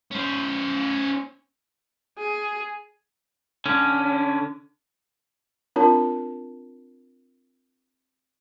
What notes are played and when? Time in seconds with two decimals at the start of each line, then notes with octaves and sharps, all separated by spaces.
0.11 C#4 C5
2.18 G#4
3.66 D3 C#4
5.76 C4 D4 F4 A#4 C#5 A5